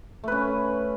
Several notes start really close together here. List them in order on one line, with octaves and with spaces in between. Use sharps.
A3 B4 C#4